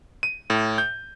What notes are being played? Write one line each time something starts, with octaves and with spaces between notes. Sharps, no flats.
D#7
A2
G6